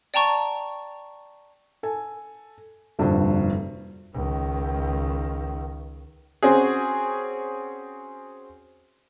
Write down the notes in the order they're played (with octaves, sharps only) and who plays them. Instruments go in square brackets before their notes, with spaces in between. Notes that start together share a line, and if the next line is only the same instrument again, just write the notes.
[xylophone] D5 G5 A5 A#5 C#6
[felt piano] A4 G#5
F1 G2 A#2 D3 F#4 C5
[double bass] C#2 D#3
[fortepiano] C4 C#4 F#4 G#4